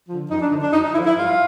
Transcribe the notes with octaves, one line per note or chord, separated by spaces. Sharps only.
D3 F3
F#2 D#4
D4
D3 F3 D#4
D4
F#2 D#4
D#4
D3 F3 E4
E4
G2 F4